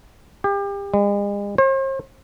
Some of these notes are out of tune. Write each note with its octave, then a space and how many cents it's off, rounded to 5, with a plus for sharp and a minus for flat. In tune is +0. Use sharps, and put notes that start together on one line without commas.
G4 +35
G#3 -40
C5 +45